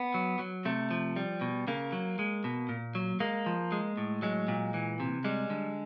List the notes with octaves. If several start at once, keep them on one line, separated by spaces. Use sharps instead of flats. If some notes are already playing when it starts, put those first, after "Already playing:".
Already playing: B3
F#3
F#3
C3 A3
F3
G3
B2
C#3 A#3
F#3
G#3
B2
A#2
F#3
G#3 A#3
F3
G#3
A2
F#3 G#3
A#2
E3
C3
G3 G#3
D3